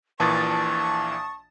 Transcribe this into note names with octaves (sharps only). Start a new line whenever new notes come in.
A#1 A#2 E3 A5 C#6 D#6 A6